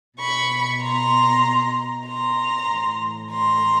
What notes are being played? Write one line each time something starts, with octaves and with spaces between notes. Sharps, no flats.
B2 B5 C#6
A#5 C6
A#5 C6
A2 E3
A#5 C6